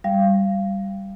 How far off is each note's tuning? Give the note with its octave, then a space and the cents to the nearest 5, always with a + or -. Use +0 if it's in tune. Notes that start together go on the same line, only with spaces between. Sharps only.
G3 +0 F5 -20